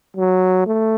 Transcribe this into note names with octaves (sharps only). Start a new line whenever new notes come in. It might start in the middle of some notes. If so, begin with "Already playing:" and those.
F#3
A3